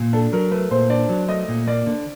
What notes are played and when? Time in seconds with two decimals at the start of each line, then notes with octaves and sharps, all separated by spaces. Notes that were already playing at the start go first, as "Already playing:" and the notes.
Already playing: A#2
0.13 D4 A4
0.33 F#3 A#4
0.51 A3 B4
0.71 A#2 C5
0.90 D4 D5
1.09 F#3
1.28 A3 D#5
1.48 A#2
1.67 A#3 D5
1.86 D3